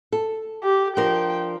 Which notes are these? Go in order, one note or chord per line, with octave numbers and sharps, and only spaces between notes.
A4
G4
F3 D4 A#4 G5